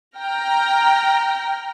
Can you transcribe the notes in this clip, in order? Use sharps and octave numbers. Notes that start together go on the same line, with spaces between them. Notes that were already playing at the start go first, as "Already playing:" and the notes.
G5 A#5 F6